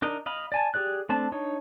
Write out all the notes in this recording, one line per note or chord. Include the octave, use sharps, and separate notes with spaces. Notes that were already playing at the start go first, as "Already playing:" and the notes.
D4 D#4 A#4 D#5
D#5 F5 B5
D5 G#5 A5
G4 G#4 D5 F#6
A3 C4 D4 A5
D4 D#4 C#5